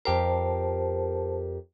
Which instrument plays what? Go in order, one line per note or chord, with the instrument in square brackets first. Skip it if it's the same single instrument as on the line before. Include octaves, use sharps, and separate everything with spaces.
[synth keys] F2 G4 A#4 [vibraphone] C5 A5